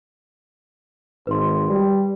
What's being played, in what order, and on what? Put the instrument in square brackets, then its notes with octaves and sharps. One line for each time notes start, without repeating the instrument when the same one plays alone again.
[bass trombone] G#1 [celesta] B4 C6
[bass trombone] G3